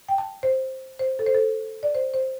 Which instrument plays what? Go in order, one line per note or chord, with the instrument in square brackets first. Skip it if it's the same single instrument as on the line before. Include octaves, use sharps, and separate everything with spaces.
[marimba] G5
A5
C5
C5
A4
C5
A4
D5
C5
C5